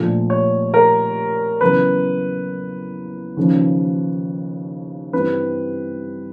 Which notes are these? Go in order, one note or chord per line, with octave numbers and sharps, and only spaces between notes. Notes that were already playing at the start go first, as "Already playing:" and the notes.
Already playing: A#2 F3 A3 D4 F4
C#5
A#4
E2 C#3 F#3 B3 B4
D#2 C#3 F3
G2 E3 G3 C4 B4